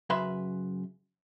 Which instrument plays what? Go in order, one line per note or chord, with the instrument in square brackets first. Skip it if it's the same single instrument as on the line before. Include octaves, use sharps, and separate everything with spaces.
[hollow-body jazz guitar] F#2 C#3 B4 E5 B5 C6